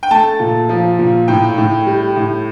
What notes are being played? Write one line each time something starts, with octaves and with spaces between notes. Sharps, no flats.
G5
A3 A5
A#2
F3
A#2
A2 G5
A2
G3
A2